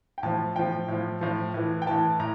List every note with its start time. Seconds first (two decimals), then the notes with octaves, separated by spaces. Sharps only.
0.18 G5
0.23 A2 F3 A5
0.55 A2 F3 G5
0.88 A2 F3
1.21 A2 F3
1.54 A2 E3
1.82 G5
1.87 A2 E3 A5
2.20 A2 A#5